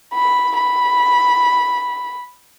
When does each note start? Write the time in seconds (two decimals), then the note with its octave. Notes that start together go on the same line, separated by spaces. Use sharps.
0.14 B5
0.58 B5